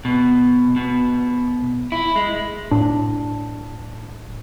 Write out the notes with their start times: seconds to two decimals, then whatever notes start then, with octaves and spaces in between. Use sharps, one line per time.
0.05 B2
0.76 B2
1.92 E4
2.16 G#3
2.71 A2 D4